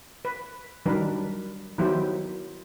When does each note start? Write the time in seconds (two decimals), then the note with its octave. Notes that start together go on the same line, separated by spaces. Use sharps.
0.25 B4
0.86 D#3 F#3 G3 D4 A#4 B4
1.78 D#3 F#3 B3 E4 G4 C5